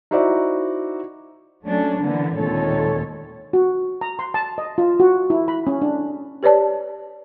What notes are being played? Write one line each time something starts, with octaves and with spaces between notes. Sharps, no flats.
D#4 E4 F#4 C5 D5 E5
F#3 A3 C#4 D4
D3 E3 A#3 B3
D#2 A#2 G#3 C4 A4 C#5
F#4
A#5
C6
A5
D#5
F4
F#4
E4
B5
C#4
D4
G4 B4 C#5 D5 A5